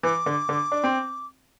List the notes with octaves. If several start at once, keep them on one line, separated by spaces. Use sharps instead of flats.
E3 D6
D3
D3
D4
C4